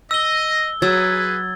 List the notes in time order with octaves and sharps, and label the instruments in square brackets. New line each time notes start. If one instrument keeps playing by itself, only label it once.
[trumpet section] D#5 [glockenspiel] E6 G7
[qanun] F#3 [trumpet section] G#4 B4 [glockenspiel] E6 G#6 A6